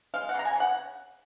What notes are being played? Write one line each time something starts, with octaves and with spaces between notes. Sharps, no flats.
G#3 F5
F#5
C#3 A#5
G#5
C#3 F#5